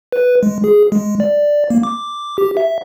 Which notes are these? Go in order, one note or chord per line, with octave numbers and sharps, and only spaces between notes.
B4
G#3
G#4
G#3
D5
A#3
D6
G4
E5